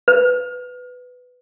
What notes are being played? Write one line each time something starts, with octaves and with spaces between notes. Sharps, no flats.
B4